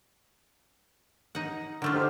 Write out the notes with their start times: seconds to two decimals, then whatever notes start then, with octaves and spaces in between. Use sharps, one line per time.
1.35 D#4 F#5
1.82 D3 A3 F4 A#4 F#5
1.93 D#4 G4 C5